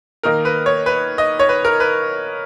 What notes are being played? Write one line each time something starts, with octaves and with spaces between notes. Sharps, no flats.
D#3 A#3 D#4 A#4
B4
C#5
B4
D#5
C#5
B4
A#4
B4